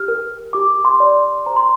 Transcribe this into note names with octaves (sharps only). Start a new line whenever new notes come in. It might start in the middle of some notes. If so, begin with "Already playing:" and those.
Already playing: G4 F6
A#4
G4 D6
C6
D5
C5 A#5
C6